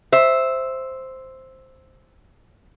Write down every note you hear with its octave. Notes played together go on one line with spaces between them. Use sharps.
C5 E5